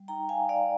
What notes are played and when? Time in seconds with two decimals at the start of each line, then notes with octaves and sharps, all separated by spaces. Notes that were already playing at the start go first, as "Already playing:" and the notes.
Already playing: G3
0.08 D#4 G5 A#5
0.29 F5 G#5
0.39 D#4
0.49 D5 F5